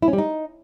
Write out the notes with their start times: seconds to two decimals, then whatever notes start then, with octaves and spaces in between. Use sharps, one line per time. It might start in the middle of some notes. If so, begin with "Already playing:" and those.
0.02 E4
0.08 C#4
0.13 G3
0.18 D#4